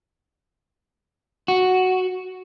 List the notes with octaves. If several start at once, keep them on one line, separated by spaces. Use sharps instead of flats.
F#4